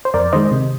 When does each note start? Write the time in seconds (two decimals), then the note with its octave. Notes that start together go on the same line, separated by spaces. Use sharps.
0.05 C5
0.14 F2 A#4 D5
0.33 D#3 G#3 C5 D#5
0.51 C3